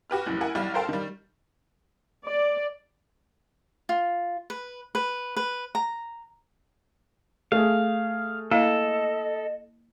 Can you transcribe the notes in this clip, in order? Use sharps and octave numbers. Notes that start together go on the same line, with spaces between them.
F#4 G4 B4 F6
F1 F#2 E3 F#6
E4 A#4 F#5 G#5
B1 E3 G3 F5 F6
A4 A#4 C5 F5 G5 A5
D#3 G3
D5
F4
B4
B4
B4
A#5
A3 G#4 F5
A#3 E4 A4 D#5